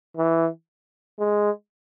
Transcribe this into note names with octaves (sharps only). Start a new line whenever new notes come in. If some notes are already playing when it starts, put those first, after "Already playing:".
E3
G#3